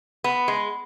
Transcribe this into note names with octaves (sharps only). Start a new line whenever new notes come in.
B3
G#3